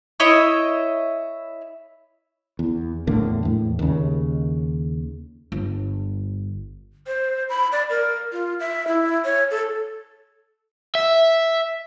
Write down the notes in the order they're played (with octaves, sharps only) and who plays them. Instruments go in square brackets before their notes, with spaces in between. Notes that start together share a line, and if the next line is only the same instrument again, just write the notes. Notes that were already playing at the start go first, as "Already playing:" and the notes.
[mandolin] E4 C#5 D#5 E5
[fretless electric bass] E2
E2 A2 D3 A#3
E2 A2
D#2 C#3
[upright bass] G1
[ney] C5
B5
D5
A#4
F4
E5
E4
C#5
A4
[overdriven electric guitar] E5